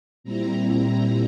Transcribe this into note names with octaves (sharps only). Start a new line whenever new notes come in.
A#2 G3 C4 E4 A#5
A#5